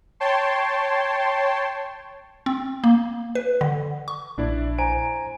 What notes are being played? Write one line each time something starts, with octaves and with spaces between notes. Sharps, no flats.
C#5 G5 A5 C6
C4
A#3
B4
D3
C#6
A#1 D4 E4 D5
C5 G#5 A#5 D7